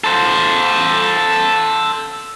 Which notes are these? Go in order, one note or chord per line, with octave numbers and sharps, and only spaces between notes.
A4 C5